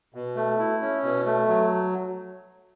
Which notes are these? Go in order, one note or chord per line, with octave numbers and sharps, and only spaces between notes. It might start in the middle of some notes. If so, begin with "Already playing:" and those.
B2
A3
E4
C#4
B2
A3
F#3